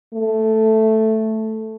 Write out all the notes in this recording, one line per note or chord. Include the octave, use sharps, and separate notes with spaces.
A3